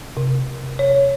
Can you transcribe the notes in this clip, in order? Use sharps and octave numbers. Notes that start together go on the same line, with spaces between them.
C3
C#5